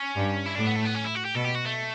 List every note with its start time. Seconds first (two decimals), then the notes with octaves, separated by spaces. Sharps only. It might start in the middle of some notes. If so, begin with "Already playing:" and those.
Already playing: C#4
0.16 G2
0.46 E4
0.56 A2 D4
0.66 B3
0.76 A3
0.86 B3
0.95 C#4
1.05 E4
1.16 F#4
1.25 G4
1.35 B2 A4
1.45 G4
1.55 F#4
1.66 A3